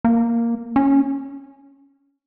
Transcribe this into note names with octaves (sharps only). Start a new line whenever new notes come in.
A#3
C#4